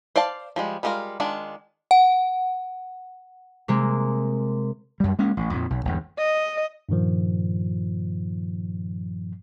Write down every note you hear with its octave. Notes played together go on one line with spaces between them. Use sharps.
C5 D5 F5 A5
F3 G3 G#3
G3 G#3 F4 F#4 A#4
D#3 G#3 D4 F4
F#5
C3 G#3 A#3
F#2 G3
G#3 A#3 C#4
A1
F2 A#2
B1
G1 E2 G#2
D#5
G2 A#2 D#3 F3